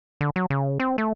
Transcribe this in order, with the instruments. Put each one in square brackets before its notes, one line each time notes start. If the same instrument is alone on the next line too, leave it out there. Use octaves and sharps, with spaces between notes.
[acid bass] D3
F#3
C#3
C4
A3